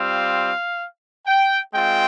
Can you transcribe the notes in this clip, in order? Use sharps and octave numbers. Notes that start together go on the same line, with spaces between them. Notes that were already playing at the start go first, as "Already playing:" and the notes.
Already playing: G3 C4 F4 F5
G5
G#3 C4 F4 G5